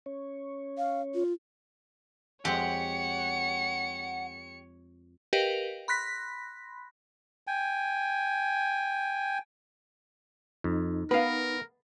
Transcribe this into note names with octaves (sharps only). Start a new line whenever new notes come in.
C#4 C#5
F5
F4
F2 G#3 G4 C#5 F#5 C#7
G4 A#4 B4 D#5 F5 G5
B5 C6 F#6 A#6 B6
G5 G#5
F2 D#4
B3 A#4 B4 F5